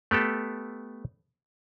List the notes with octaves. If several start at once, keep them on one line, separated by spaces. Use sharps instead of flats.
A3 B3 G4 A4